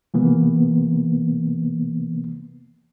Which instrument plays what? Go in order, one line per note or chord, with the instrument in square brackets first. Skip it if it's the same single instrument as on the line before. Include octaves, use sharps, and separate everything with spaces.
[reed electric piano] C3 E3 A#3 B3